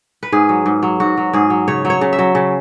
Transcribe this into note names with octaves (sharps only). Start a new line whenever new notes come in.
B4
G#2 G#4
F#3
G#2
F#3
G#2 F#4
F#3
G#2 G#4
F#3
C#3 C#5
F#3
C#5
C#3
E5
F#3
C#3